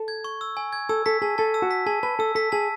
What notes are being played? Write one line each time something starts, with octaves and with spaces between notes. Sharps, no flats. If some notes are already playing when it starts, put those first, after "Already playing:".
Already playing: A4
G#6
C#6
E6
G#5
G#6
A4 E6
A4 B6
G#4 A5
A4 A5
E6
F#4
B6
G#4 A5
B4 A5
A4 E6
A4 B6
G#4 A5